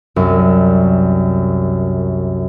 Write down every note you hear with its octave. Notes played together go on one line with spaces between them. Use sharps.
C2 F#2